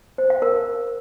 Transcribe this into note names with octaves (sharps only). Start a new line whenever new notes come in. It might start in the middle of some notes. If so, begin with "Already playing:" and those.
C5
F5
A#4